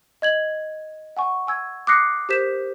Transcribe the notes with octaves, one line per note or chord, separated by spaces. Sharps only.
D#5 G#6 F#7
F#5 G#5 C#6
G#5 E6 G#6
D6 D#6 F#6 A#6 C7 C#7
G4 A#4 C5 G6 B6 E7